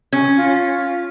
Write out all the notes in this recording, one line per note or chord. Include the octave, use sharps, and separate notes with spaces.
C#4
F4